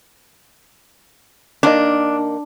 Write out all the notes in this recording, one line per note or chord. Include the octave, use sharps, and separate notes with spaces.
D#3 A#3 D4 D#5